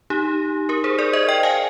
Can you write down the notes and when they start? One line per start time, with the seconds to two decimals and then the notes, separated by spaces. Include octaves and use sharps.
0.10 D#4 G4
0.69 G4 A#4
0.84 G#4 C5
0.99 A#4 D5
1.13 C5 D#5
1.29 D#5 G5
1.43 F5 G#5